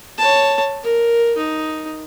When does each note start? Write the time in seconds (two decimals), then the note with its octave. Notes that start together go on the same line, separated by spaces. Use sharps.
0.18 C#5 A5
0.83 A#4
1.37 D#4